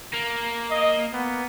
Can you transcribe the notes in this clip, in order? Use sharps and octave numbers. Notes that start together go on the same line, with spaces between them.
A#3
D#5
A#3 B3